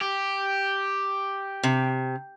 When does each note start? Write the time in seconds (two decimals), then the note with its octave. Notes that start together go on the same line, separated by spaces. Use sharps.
0.01 G4
1.63 C3